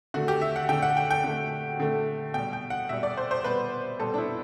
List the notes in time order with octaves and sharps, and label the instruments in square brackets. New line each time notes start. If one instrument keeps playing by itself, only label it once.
[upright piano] D3 A3 F#4
G4
E5
F#5
D3 A3 G5
F#5
G5
G5
D3 A3
D3 A3
B2 G3 G5
G5
F#5
B2 G3 E5
D5
C5
C5
B2 G3 B4
B2 G3 A4
D4
E4